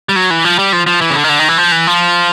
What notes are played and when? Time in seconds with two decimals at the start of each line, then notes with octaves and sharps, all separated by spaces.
0.09 G3
0.16 F#3
0.30 E3
0.44 F3
0.59 G3
0.73 F3
0.87 F3
1.01 E3
1.10 C#3
1.16 D3
1.24 D#3
1.29 D3
1.39 D#3
1.49 E3
1.58 F3
1.72 E3
1.87 F3